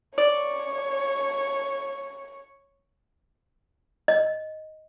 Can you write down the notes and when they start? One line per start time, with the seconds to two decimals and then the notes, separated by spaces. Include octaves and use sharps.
0.18 C#5 D5
4.08 D#5